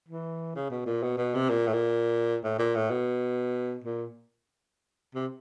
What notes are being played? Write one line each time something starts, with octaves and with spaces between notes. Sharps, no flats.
E3
C#3
B2
A#2
B2
B2
C3
A#2
A2
A#2
A2
A#2
A2
B2
A#2
C3